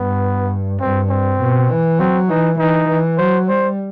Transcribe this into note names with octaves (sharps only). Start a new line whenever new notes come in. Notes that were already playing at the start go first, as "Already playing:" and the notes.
Already playing: G2 B3
G2 C4
C4
B2
E3
F#3 C4
E3 D#4
E3 D#4
E3
F#3 C5
G3 C5